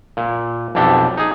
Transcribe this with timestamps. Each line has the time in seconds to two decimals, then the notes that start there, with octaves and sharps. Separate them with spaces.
0.17 A#2
0.75 B1 F2 D4 G4 A4
1.17 D#4 G#4